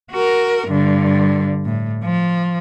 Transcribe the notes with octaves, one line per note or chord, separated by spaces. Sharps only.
F#4 A#4
G2 D3
A2
F3